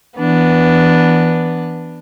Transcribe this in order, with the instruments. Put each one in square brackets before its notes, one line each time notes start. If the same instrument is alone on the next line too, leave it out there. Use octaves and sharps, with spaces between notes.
[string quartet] E3 B3 D4